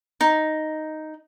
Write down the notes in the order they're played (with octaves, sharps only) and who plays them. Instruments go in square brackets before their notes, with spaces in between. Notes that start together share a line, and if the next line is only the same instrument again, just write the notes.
[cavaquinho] D#4